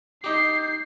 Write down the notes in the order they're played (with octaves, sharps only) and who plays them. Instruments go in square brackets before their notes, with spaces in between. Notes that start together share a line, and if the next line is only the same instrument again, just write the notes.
[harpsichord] D#4 G4 [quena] G6 [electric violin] C7